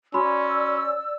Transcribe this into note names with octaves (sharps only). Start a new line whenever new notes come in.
C#4 F#4 D5 B5 C6 E6